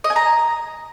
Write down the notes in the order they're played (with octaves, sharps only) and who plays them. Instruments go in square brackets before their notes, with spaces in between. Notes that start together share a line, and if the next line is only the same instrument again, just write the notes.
[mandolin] D#5
G#5
A#5